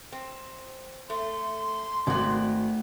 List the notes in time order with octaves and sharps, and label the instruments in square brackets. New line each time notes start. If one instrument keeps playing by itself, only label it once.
[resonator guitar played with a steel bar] C4
[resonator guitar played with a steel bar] A3 [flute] C6
[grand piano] G#1 [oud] A3 A#3 [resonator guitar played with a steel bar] F#4 D5